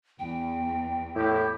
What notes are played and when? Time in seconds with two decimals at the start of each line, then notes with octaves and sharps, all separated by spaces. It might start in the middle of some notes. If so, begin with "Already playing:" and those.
0.19 E2 G5
1.16 A2 E4 G4